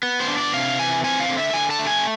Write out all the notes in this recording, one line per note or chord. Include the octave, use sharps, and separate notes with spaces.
B3
C5
D4
D5
C3 F5
E3 G#5
C4 G#5
F5
D3
E5
D3 G#5
A5
A3
G#5